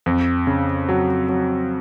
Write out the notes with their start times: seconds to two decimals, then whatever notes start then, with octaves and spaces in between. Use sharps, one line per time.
0.06 F2
0.47 C#3
0.89 F#3
1.29 F#3